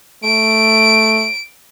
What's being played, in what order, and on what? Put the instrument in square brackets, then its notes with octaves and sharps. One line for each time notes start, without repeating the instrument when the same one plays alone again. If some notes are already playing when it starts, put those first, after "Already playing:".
[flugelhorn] A3 [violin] D7